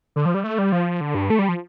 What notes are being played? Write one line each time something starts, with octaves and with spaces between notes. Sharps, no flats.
D3
F3
G3
A3
G3
F3
D3
G2
A3
G3
F3